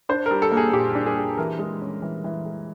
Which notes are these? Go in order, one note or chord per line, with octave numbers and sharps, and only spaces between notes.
D4 C5
A#4
G3
A4
A#3
G#4
A#2 G4
D4
G#4
G3
E3 A#4
G#3
C#4
E3
E3
G#3